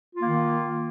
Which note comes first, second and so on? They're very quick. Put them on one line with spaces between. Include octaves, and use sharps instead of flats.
F4 A#3 D#3